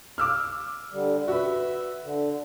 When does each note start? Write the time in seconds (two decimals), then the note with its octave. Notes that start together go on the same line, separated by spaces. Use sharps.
0.18 D6 E6 F6
0.92 D3 G3
1.28 F#4 B4 E5
2.03 D3